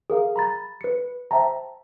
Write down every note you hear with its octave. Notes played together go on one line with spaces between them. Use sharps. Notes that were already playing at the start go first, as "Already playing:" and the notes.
G#4 A#4 F5
A#5 B5 A6
B4 C#7
C5 E5 G5 A5 A#5